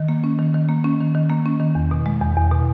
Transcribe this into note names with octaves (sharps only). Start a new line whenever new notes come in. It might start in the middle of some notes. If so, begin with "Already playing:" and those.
Already playing: D#3
A#3
C#4
D#3
D#3
A#3
C#4
D#3
D#3
A#3
C#4
D#3
E2
B2
G#3
E2
E2
B2